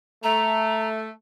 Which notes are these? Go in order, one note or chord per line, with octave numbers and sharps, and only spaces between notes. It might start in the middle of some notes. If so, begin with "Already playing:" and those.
A3 A#5